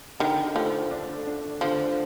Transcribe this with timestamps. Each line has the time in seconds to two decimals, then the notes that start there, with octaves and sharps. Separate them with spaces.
0.20 D3 D#3
0.55 F3 A3
0.91 D4
1.27 D4
1.61 D3 F3